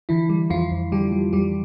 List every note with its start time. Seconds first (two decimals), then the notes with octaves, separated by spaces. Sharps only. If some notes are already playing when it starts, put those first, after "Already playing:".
0.09 D3 E3 E4
0.29 G3
0.50 F2 F3 F4
0.71 F2
0.92 D3 G3 G4
1.12 G3
1.33 F2 G3 G4